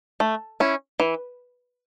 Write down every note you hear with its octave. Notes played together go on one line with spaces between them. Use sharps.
A3
C#4 E4
E3